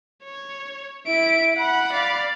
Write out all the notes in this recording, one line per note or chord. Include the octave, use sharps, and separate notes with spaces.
C#5
E4 E5 D7
F#5 B5
D5 F5